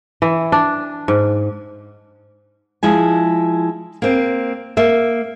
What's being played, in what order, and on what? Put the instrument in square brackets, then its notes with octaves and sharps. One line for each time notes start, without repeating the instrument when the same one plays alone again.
[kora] E3
D4
G#2
[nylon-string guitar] F3 G#3 E4 G#5
A#3 C4
A#3 E5